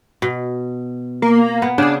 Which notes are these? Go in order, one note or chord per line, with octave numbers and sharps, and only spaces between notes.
B2
A#3
B3
C#3 D4 G#4